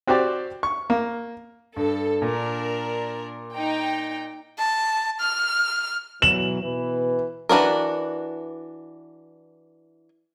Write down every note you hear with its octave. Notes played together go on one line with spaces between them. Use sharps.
C4 F#4 G4 C5 D5
C#6
A#3
G2 A4
A#2 D4 A#4
D#4 G5
A5
F6
B2 E3 F#3 E7 F#7
B2 E3 B4
E3 D4 F#4 A#4